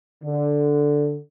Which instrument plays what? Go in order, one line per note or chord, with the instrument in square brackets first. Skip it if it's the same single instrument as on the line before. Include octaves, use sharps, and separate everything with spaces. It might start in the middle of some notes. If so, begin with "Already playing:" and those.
[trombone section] D3